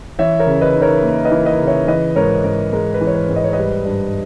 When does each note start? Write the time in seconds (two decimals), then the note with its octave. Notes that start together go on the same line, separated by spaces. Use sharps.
0.19 E3 C#5 E5
0.39 A#4 C#5
0.47 C#3
0.61 B4 D#5
0.75 D#4
0.81 A#4 C#5
1.03 A#3
1.25 B4 D#5
1.31 E3
1.45 B4 D#5
1.60 C#3
1.67 C#5 E5
1.88 E3 B4 D#5
2.16 G#2 A#4 C#5
2.44 G#2 A#4
2.73 G#3 A#4
2.94 B4
3.01 E3
3.07 C#5
3.14 B4
3.29 G#2
3.36 D#5
3.44 C#5
3.53 G3 B4 D#5
3.85 G2